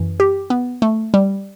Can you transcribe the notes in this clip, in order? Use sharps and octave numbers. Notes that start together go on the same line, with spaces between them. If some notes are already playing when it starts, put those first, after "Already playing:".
Already playing: F#2 E3
G4
B3
A3
G3